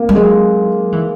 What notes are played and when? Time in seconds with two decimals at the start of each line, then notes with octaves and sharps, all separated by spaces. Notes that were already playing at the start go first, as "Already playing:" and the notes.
Already playing: A#3
0.09 G3
0.15 F#3 G#3
0.92 E3